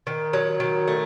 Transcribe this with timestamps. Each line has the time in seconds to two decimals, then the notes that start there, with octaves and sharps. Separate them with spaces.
0.07 D#3
0.33 F#3
0.60 D#3
0.88 A3